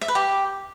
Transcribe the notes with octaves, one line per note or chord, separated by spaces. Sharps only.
E5
B4
G4